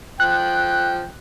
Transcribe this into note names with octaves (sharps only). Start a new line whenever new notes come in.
F3 G5 F#6